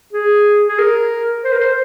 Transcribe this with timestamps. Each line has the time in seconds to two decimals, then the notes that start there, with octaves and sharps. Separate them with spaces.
0.13 G#4
0.68 G#4
0.79 A#4
1.44 C5
1.53 A#4
1.60 C5